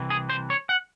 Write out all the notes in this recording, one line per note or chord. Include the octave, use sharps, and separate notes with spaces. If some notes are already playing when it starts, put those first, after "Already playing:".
Already playing: C2 C3 E3
G#4
C5
C#5
F#5